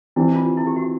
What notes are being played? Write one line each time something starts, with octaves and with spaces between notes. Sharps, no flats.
E3 G3 C4 E4
F4
E4
G4
F#4